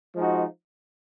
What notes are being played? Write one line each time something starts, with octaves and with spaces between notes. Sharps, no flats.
F3 G#3 D#4 F#4